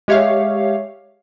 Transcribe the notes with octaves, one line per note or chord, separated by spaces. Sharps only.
G#3 G4 C#5 E5 F5